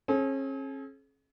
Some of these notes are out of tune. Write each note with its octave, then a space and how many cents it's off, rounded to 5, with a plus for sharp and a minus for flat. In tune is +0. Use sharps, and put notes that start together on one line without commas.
C#4 -40 G#4 +45